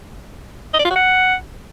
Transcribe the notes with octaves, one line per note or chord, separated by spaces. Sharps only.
D#5
D5
F4
F#4
F#5